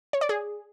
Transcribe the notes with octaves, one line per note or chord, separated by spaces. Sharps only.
C#5
D5
G#4